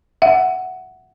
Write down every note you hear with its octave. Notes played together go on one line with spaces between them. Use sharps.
E5 F#5